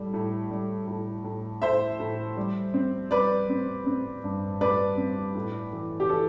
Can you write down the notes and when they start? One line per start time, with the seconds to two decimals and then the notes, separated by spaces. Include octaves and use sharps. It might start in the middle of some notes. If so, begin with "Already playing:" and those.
Already playing: A2 G3
0.14 A2
0.51 G3
0.88 A2
1.24 A2
1.62 A2 C5 E5
2.00 A2
2.37 G3
2.74 C4
3.11 G3 B4 D5
3.49 C4
3.86 C4
4.24 G2
4.61 G3 B4 D5
4.97 C4
5.35 A2
5.73 E3
6.00 G4
6.09 E3 A4